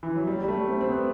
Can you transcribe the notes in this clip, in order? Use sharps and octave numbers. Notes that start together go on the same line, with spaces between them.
E3
F#3
G3
G3
A3
C4
C4
B3